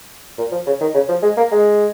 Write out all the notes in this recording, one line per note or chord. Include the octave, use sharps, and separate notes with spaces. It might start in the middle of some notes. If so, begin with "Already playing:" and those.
A#2
F3
C#3
D#3
C#3
F3
G#3
A#3
G#3